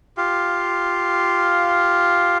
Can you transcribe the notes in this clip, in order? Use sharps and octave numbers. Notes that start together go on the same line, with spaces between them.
F4 G4 F5